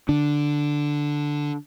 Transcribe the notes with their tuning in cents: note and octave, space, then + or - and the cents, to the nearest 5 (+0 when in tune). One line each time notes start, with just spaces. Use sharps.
D3 +0 D4 +0